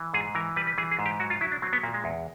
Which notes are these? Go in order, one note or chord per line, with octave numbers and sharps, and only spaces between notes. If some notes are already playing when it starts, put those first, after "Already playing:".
Already playing: E3
G#2 G#4
E3 A#4
G3 B4
B4
E3 G#4
G#4
G#2
G4
F#3 F#4
F4
F#3 E4
D4
F#3 C4
B3
A#2 A#3
G#3
E2